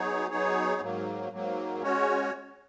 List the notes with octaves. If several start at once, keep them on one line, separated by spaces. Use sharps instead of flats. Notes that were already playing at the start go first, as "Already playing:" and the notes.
Already playing: F#3 B3 D#4 G#4 C#5
F#3 B3 D#4 G#4 C#5
G#2 F#3 A#3
G#2 F#3 A#3
G#3 C#4 F#4 C#5